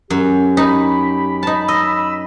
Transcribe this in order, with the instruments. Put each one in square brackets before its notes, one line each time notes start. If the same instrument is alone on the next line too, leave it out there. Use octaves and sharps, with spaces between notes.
[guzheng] F#2 [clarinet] G4
[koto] D#4 [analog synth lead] B5
[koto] D#4 A5
[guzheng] D#5 [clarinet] E6